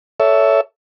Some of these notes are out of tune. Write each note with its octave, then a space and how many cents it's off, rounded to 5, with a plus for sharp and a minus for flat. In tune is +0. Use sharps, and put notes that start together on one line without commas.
A4 +0 C#5 +25 E5 +0